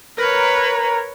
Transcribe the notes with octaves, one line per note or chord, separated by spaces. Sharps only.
A#4 B4 C#5